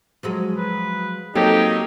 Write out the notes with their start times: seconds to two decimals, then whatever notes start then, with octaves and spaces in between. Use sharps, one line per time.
0.23 F3 F#3 G#3
0.56 B4
1.35 F#3 A#3 C4 D#4 G4 A4